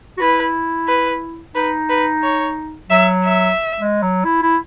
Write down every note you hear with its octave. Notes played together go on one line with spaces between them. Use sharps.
F#4
E4 B4
B4
D#4 B4
B4
C#5
F#3 E5
E5
G#3
F#3
E4
E4